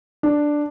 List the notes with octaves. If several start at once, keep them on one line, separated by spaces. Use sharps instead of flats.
D4